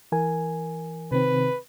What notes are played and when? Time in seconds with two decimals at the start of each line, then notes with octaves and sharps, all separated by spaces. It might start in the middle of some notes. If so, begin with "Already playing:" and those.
0.12 E3 A#4 G#5
1.11 C3 D#3 C4 B4